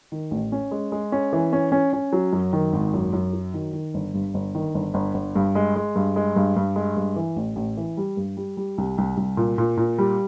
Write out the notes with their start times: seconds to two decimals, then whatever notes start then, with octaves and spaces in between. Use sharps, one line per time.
0.12 D#3
0.31 A1
0.52 C#4
0.71 G#3
0.92 G#3
1.12 C#4
1.33 E3
1.53 C#4
1.72 C#4
1.93 C#4
2.13 F#3
2.33 F#2
2.53 D#3
2.73 G#1
2.94 F#2
3.13 F#2
3.33 F#3
3.54 D#3
3.73 D#3
3.94 G1
4.14 G2
4.34 G1
4.55 D#3
4.75 G1
4.94 G1
5.14 G1
5.36 G2
5.55 G#3
5.76 G#3
5.96 G2
6.16 G#3
6.36 G2
6.56 G2
6.76 G#3
6.97 G2
7.16 E3
7.36 A1
7.56 A1
7.77 E3
7.97 G3
8.17 G2
8.37 G3
8.57 G3
8.78 C2
8.98 C2
9.17 C2
9.37 A#2
9.58 A#2
9.77 A#2
9.98 G3